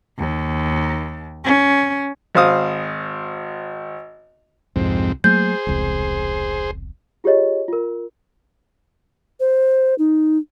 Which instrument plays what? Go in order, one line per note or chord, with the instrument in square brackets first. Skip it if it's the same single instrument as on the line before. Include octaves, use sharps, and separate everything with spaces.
[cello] D#2
C#4
[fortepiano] G#1 C5 F5 D#6
[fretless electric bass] C2 [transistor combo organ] F2 G#2 C4
[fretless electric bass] F#3 A3 A#3 [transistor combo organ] G#4 C5 [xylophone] G6
[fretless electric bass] E1 C2
[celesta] F4 G4 G#4 C#5 D#5
F4 A#4
[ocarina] C5
D#4